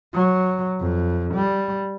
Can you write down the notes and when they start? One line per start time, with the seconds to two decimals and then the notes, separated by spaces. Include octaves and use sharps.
0.14 F#3
0.80 F2
1.35 G3